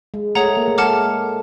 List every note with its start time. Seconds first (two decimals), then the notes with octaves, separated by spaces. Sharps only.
0.14 G#3
0.35 A3 G#4 C#5 F#5 A#5
0.57 A#3
0.68 A3
0.78 G#3 F#5 A5 D6 F6